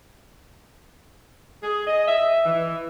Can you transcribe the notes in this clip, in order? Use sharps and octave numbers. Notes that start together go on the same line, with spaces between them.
G#4
D#5
E5
E3